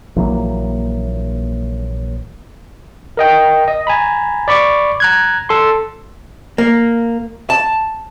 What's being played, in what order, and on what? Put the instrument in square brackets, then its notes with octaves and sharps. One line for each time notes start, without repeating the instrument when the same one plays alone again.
[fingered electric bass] A#1 E3 F#3 A#3
[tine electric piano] A#4 D#5 G5
D#5
G#5 A#5 B5
D5 B5 C#6 D6
A#5 F#6 G#6
A4 C6
[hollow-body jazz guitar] A#3
A5